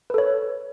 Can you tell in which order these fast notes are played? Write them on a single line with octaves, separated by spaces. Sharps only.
B4 A4 C#5